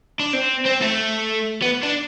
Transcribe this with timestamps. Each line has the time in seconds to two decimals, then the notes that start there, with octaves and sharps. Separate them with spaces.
0.20 D4
0.33 C4
0.65 C4
0.81 A3
1.62 B3
1.83 D4